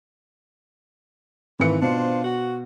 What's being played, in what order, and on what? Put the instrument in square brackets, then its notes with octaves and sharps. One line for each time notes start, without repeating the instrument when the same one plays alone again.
[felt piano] G#1 C#7 [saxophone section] E3 A3
[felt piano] B2 [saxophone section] D4 F4 C5
[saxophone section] F#4